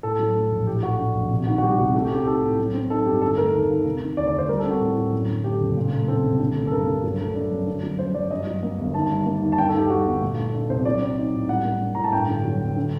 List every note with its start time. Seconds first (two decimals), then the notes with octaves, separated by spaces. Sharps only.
0.03 A2 A4
0.19 F#3
0.35 A3
0.51 A#1
0.67 A2 G4
0.83 A3 F#4
0.99 D4
1.15 A#1
1.30 C3
1.47 D#3 F#4
1.58 F#4
1.62 G3 G4
1.78 C2 F#4
1.94 A3 F#4
2.05 G4
2.11 C4
2.16 G4
2.26 D#4 A4
2.42 A2
2.58 F#3
2.74 C4
2.90 D#4 A4
3.06 G2 G4
3.21 D3 A4
3.37 A3 A#4
3.53 D#2
3.69 D#2
3.85 C3
4.01 D#3
4.17 D2 D5
4.28 D5
4.33 D2
4.38 C5
4.49 G3 A#4
4.59 A4
4.65 C4
4.70 F#4
4.80 A2
4.97 A2
5.13 F#2
5.29 D3
5.44 A3 G4
5.60 F#1
5.76 A#2
5.92 A3
6.08 C4 A4
6.24 C2
6.40 D3
6.56 A3
6.67 A4
6.72 G2 A#4
6.87 G2
7.04 F#3
7.19 A3
7.35 D4
7.51 F#2
7.67 D3
7.83 F#3
7.99 F#2 C5
8.14 F#2 D5
8.31 G2 D#5
8.47 F#3
8.63 A#3
8.78 G1
8.94 D#3 A5
9.10 G3
9.26 A#3
9.42 D#2
9.52 A5
9.58 G2 G5
9.69 A4
9.74 D#3 G4
9.90 G3 F#4
10.06 G1
10.22 A#2
10.37 A3
10.54 D4
10.69 C2 C5
10.85 F#3 D5
11.01 C4
11.18 D#4
11.33 A2
11.49 G3 F#5
11.65 A#3
11.81 D4
11.95 A2 A#5
12.04 A5
12.13 G2 G5
12.28 D3
12.44 F#3
12.60 G1
12.76 D3